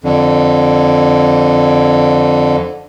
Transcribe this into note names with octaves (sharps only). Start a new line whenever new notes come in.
F2 D3